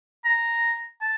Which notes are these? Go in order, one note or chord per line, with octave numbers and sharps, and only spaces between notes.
A#5
A5